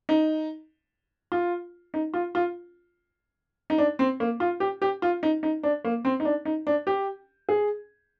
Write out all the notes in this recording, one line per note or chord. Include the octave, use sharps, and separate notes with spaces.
D#4
F4
D#4
F4
F4
D#4
D4
C4
A#3
F4
G4
G4
F4
D#4
D#4
D4
A#3
C4
D#4
D4
D#4
D4
G4
G#4